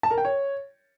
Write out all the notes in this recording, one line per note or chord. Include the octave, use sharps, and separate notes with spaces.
A5
A#4
G5
C#5